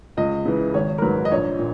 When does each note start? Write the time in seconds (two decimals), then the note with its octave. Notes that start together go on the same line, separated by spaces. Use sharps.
0.17 C#2 D#5
0.45 C#3 E3
0.74 G#1 C#5
0.98 A#4
1.02 G#2 F#3 B4
1.25 D#5
1.31 A#1 C#5
1.59 A#2